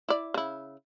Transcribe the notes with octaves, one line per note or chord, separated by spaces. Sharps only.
E4 D5
C#3 E4